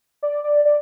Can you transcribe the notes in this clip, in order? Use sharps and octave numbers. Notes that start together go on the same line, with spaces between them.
D5
D5
D5